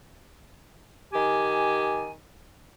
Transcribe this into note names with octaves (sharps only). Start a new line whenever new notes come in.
D#3 G4 G#5